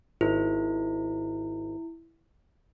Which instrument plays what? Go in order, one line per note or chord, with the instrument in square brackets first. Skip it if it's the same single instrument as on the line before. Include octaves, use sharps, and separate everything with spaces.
[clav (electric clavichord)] G#1 [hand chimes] E4